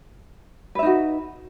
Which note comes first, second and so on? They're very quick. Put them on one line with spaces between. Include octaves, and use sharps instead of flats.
B4 E5 D#4 F#4